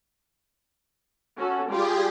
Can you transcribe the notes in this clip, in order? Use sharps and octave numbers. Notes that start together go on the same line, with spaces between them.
C#4 F#4 A4
G3 F4 G4 G#4 D5